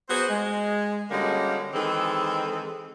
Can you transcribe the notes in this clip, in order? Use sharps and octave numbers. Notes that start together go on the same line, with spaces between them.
B3 F#4 G#4 C5
G#3
D3 G3 G#3 A#3 C#4 F#4
D#3 E3 G#3 C4 G#4 A4